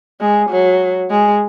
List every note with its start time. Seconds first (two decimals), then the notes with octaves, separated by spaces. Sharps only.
0.21 G#3
0.50 F#3
1.11 G#3